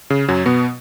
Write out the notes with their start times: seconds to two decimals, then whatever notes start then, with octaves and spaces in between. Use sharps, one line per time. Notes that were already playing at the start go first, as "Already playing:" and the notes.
0.10 C#3
0.28 F#2 F#3
0.46 B2 B3